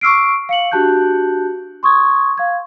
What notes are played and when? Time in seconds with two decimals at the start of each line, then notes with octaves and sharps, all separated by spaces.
0.01 C#6 D6 E6 F6 C7 D7
0.49 F5 C#7 F#7
0.71 D4 F#4 G4 A5 F#6 G6
1.83 C6 C#6 D#6 G#6
2.38 F5 G#6